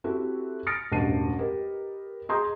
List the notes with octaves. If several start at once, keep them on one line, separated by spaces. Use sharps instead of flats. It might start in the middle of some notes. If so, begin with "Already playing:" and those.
C4 E4 F#4 G4 A4
D#6 F6 A6 A#6 C#7 D7
E1 A1 G2 A5 C7 D#7
G4 A#4 B4 D#5
G#4 D#5 A#5 C6 D#6 G6